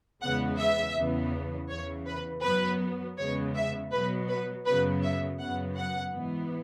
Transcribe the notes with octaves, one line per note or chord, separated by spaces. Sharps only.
E2 C#3 G#3 B3 F#5
E5
E2 C#3 E3 B3
E2 C#3 E3 C#5
B4
F#2 F#3 B3 B4
E2 C#3 G#3 B3 C#5
E5
B2 F#3 B3 B4
B4
F#2 C#3 F#3 B3 B4
E5
F#2 C#3 F#3 B3 F#5
F#5
G#2 E3 B3